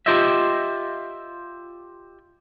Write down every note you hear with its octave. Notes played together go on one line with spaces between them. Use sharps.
F4 G4 C5 D#5 E5